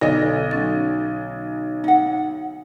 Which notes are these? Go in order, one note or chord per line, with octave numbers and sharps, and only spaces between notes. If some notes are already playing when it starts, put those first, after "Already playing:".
B1 D3 A4 D#5 A#6
F#3 C#4 A6
D#4 F#5